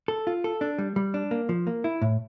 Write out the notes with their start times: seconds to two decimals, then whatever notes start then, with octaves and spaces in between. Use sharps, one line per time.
0.08 A4
0.27 F4
0.44 A4
0.61 D4
0.78 G3
0.96 G3
1.14 D4
1.31 A#3
1.49 F3
1.67 A#3
1.84 E4
2.02 A2